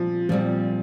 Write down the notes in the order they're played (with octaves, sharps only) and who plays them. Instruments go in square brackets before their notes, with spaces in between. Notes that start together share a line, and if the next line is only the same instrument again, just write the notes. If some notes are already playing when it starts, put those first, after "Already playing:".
Already playing: [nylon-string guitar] A#2 G3 C4 [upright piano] F3
[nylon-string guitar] A#2 G3 C4 [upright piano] F3